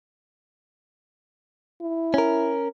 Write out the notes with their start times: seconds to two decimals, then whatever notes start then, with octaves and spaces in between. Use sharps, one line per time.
1.81 E4
2.14 C#4 A#4